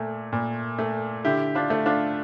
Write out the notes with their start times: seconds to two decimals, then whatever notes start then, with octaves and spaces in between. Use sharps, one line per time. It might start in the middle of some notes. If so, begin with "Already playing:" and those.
Already playing: A#2 A3
0.33 A#2
0.79 A3
1.25 D3 E4 G4
1.55 D4 F4
1.70 A3
1.86 D4 F4